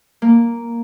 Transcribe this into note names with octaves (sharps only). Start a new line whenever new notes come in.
A#3